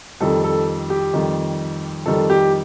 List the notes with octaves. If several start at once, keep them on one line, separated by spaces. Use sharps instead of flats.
F2 D#3 G3 A4
A4
G4
F2 D#3 G3
F2 D#3 G3 A4
G4